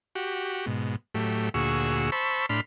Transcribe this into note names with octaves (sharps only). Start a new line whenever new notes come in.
F#4 G4
G#2 B2
A2 F#3 A3 G4
D2 A#2 F#4 G#4 C#6 E6
C5 A5 B5 C#6 E6
A2 D4 B5 C6 F6